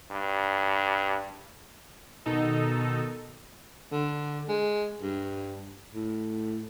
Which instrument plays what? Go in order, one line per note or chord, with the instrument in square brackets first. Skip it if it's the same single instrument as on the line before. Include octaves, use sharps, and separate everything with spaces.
[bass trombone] G2
[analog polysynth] B2 D#3 D#4 A4
[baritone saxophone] D3
G#3
G2
A2